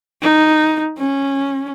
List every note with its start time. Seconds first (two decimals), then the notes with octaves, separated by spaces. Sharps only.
0.22 D#4
0.98 C#4